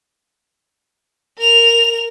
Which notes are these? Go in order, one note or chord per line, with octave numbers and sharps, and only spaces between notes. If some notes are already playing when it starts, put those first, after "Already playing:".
A#4 F7